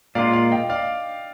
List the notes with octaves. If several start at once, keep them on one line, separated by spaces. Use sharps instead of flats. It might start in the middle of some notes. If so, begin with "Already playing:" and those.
A#2 G#3 D4 F4 D5 F5
D5 F5
D#5 G5
D5 F5